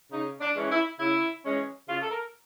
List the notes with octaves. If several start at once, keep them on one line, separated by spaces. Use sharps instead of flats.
C#3 D#4
D4
E3 G#3 C#4
E4
C#3 E4
E3 G#3 C#4
C#3 F4
A4
A#4